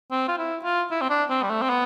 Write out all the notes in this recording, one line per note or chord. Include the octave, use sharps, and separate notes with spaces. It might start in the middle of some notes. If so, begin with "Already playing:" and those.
C4
F4
E4
F4
E4
C4
D4
C4
G3
A3
C4
B3